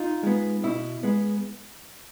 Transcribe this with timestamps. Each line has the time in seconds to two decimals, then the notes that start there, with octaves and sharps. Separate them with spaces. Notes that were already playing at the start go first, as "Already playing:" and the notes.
Already playing: D#4 F4
0.23 G#3 B3
0.63 B2 E4
1.03 G#3 B3